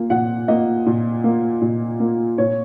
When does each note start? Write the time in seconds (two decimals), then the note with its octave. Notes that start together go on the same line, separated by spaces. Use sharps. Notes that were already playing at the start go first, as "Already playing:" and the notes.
Already playing: A#2 A#3
0.10 A#2 F#5
0.48 A#3 D#5
0.86 A#2
1.24 A#3
1.62 A#2
2.00 A#3
2.38 A#2 C#5